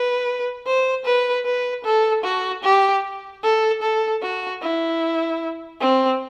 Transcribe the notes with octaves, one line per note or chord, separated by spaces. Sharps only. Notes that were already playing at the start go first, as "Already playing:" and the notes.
Already playing: B4
C5
B4
B4
A4
F#4
G4
A4
A4
F#4
E4
C4